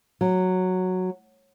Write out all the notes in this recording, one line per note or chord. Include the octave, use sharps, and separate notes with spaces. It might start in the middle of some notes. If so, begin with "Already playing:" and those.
F#3